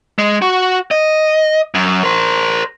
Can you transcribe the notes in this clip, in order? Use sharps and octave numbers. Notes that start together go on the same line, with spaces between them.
G#3
F#4
D#5
F#2
A#4 C5